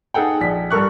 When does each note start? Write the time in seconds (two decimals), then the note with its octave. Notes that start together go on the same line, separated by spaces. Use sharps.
0.14 D#4 G#4 A4 F#5 G5
0.41 A#1 B6
0.71 G2 A4 A#4 C#6 F#6